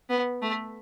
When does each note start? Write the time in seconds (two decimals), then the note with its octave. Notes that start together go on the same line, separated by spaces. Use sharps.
0.10 B3
0.42 A3